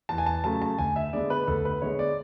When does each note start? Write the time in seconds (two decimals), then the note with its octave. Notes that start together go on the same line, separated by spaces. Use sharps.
0.09 E2 A5
0.18 G#5
0.26 A5
0.44 C#3 F#3 A3 A5
0.62 A5
0.78 D2 G#5
0.96 E5
1.13 D3 G#3 B3 D5
1.30 B4
1.48 D2 A4
1.65 B4
1.82 D3 G#3 B3 C#5
1.99 D5